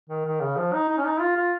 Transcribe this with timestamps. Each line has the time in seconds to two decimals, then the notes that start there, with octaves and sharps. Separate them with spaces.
0.09 D#3
0.25 D#3
0.41 C#3
0.57 F3
0.73 D#4
0.89 D#4
0.98 C#4
1.05 D#4
1.20 F4
1.36 F4